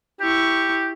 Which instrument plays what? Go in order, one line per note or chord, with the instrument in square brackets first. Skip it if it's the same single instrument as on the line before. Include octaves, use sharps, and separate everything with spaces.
[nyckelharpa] E4 C#6 [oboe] G4